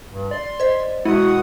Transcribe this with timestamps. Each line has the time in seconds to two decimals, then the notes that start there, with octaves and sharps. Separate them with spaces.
0.11 G2
0.31 D5 C6
0.60 C5 D#5
1.05 B2 G#3 E4 F#4 F#5 D#6